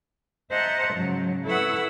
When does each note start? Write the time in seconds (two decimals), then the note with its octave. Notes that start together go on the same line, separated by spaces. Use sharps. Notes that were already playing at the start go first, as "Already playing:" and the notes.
0.50 C5 D#5 E5 F#5 A5 A#5
0.94 G#2 C#3 F#3
1.46 E4 A4 B4 F#5 C#6 E6